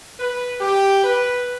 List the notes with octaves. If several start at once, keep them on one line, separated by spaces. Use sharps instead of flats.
B4
G4
B4